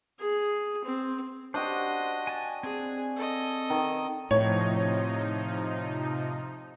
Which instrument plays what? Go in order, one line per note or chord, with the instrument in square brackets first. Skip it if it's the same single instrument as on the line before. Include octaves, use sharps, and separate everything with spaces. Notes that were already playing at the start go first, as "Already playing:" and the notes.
[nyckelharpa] G#4
C4
[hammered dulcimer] D4 F#4 G4 [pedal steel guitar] C5 [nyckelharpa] D#5
[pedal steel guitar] G#5 A5
[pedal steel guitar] C4 G#5 [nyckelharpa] G#4
[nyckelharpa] A4 D#5
[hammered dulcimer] D#3
[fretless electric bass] A2 [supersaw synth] C3 F3 D#4 [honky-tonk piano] C#5